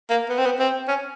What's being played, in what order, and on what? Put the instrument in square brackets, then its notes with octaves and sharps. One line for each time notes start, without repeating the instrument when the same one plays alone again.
[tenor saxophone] A#3
B3
C4
B3
C4
C#4